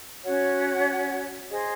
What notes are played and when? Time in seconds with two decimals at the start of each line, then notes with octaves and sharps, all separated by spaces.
0.24 C#4 F#4 C#5 F#5
1.50 G#4 C5 D#5